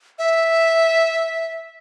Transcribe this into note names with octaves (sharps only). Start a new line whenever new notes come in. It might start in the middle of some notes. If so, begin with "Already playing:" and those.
E5